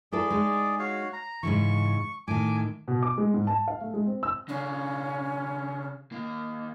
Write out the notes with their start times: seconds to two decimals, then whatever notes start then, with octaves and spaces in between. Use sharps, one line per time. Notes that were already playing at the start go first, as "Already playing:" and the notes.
0.12 E4 G#4 A4 B4 D5
0.30 G#3 D#4
0.79 F#4 C#5 F5
1.13 A#5
1.43 G#2 C#3 E3 C#6
2.28 A2 D#3 G#5 D6
2.88 B2
3.03 D6
3.18 G#3
3.34 G#2
3.47 A5
3.68 F5
3.81 A3
3.94 G#3
4.06 C4
4.23 E6
4.49 C#3 C#4 D4
6.12 D#2 A#3